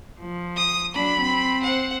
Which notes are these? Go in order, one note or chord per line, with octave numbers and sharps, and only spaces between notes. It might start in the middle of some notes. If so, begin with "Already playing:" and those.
F3
D#6
F#3 D4 B5
C4
C5 F#5